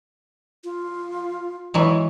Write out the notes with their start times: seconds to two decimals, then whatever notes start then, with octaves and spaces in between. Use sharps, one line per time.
0.64 F4
1.74 E3 F#3 G#3